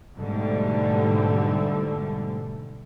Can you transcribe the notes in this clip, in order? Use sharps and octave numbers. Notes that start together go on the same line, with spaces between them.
G#2 B2 D3 G3 A3